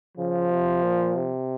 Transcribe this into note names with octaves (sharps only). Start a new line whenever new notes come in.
C#3 F3
C3
A#2
C3